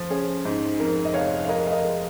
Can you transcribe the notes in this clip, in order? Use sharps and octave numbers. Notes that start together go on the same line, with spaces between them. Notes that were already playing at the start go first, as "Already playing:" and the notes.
Already playing: F3
C#4 G#4
G#2
F2 A#4
D#5
F1 C#5 F5
F5
G#3 A#4 D#5
F5
A#4 D#5
G#3